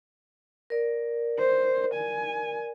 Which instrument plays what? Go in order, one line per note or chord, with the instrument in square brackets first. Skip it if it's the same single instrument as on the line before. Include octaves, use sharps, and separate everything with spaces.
[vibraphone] A#4 D5
[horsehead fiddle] C5
G#5